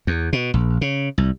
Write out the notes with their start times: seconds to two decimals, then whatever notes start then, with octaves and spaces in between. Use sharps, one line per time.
0.07 E2
0.33 B2
0.54 A#1
0.81 C#3
1.18 C2